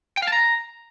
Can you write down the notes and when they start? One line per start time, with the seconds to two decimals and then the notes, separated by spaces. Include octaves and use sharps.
0.17 G5
0.22 F5
0.27 A5
0.32 A#5